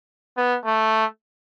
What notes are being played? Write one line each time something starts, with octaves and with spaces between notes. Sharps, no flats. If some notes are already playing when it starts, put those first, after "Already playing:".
B3
A3